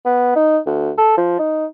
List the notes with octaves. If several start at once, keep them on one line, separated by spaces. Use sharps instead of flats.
B3
D#4
D2
A4
F3
D#4